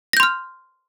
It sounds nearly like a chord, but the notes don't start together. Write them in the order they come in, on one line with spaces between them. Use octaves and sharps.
A#6 G6 C6 F6